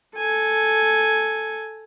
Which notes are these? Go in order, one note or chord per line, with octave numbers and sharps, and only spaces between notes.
A4 G#5